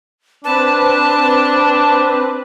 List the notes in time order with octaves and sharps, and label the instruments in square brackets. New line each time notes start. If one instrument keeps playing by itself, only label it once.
[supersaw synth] C4 B4 [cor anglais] D4 [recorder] A5